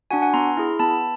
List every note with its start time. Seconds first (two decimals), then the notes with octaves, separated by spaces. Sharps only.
0.11 D4 F#4 F#5 G#5
0.22 F#5 G#5
0.33 B3 A#5 C6
0.57 E4 G#4
0.79 B3 A5 B5